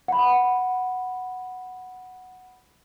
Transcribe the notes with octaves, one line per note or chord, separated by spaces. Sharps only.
F#5 B5